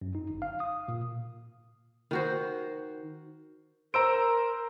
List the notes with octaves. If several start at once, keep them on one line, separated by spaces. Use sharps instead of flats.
F#2
D#4
G1
F5
D#6
A#2
D#3 F#4 C5
A#4 C5 A#5 E6 D7